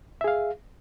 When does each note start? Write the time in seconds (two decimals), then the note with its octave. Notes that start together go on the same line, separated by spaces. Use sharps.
0.21 E5
0.24 G#4
0.28 F5